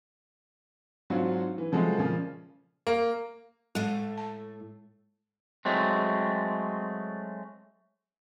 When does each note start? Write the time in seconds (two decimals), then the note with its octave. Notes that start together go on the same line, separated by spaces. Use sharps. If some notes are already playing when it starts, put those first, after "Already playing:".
1.10 G#2 F#3 C4 D4 F4 F#4
1.58 E3
1.72 C#3 F3 F#3 G#3 A3
1.98 A#2 C#3 F3
2.87 A#3
3.75 A2 G#3 A3
4.17 A5
5.65 F#3 G#3 A3 C4